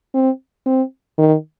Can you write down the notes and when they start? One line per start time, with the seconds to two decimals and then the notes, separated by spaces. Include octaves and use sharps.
0.14 C4
0.66 C4
1.18 D#3